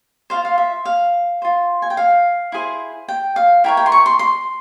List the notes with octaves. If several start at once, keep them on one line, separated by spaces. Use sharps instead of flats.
F4 C5 F5
F5
E5
F5
F4 C5
G#5
G5
F5
E4 G#4 C5
G5
F5
E4 A#4 C#5 G5
G5
C6
C#6
C6
C6